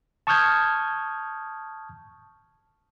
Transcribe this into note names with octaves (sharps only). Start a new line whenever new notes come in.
A5 C#6 D#6 F6 G6 G#6